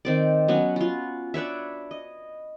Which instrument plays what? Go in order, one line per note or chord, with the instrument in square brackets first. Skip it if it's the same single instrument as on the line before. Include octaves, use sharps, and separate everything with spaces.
[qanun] D#3 C4 D5
F#3 B3 C#4 F#4
F4 F#4
D4 B4 C#5 E5
D#5